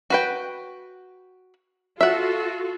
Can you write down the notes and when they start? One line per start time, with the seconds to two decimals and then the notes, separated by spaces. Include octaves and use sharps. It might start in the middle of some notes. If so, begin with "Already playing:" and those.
0.10 F#4 B4 G5
2.01 F4 F#4 A4 E5 F#5